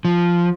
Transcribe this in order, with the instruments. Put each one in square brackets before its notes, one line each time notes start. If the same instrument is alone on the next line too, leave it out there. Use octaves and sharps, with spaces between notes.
[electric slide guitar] F3